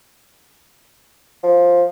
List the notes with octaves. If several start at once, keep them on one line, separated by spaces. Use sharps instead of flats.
F3